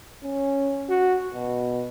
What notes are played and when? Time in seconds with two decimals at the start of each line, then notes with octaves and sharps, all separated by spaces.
0.23 C#4
0.89 F#4
1.34 B2